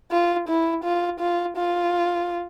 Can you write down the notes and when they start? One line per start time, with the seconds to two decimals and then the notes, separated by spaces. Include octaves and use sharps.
0.11 F4
0.48 E4
0.84 F4
1.20 F4
1.57 F4